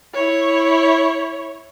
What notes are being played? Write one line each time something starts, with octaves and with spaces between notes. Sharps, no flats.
E4 C#5